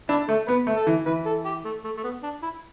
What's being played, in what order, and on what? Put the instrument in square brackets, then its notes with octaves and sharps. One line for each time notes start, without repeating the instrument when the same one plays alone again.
[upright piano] D4 [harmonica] E4
[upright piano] A3 [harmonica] A4
[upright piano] B3 [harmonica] B4
[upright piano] A3
[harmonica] A4
[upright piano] E3
[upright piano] E3 [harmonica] B4
[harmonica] A4
G4
A3
A3
A3
B3
D4
E4